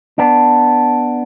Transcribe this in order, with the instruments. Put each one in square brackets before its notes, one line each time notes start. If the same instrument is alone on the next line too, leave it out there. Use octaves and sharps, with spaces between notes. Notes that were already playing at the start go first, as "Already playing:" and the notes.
[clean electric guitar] B3 D4